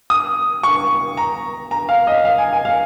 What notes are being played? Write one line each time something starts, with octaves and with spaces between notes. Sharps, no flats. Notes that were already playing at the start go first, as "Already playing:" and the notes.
D#6
C#6
A#5
A#5
F5
D#5
F5
G#5
G#5
F5